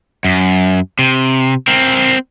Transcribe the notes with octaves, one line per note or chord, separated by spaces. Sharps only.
F#2
C3
C4 A#4